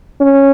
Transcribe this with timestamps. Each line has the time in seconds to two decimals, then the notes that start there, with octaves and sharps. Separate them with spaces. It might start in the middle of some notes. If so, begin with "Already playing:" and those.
0.21 C#4